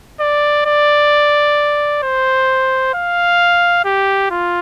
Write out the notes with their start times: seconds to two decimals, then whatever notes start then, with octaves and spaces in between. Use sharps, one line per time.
0.20 D5
0.66 D5
2.03 C5
2.94 F5
3.85 G4
4.31 F4